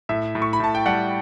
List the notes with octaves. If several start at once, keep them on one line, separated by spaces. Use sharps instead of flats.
A2 E5
A2
C#6
B5
A2 A5
G5
G3 F#5